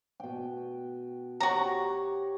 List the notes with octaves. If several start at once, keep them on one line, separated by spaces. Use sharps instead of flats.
B2 G5
F#4 G4 C#5 A#5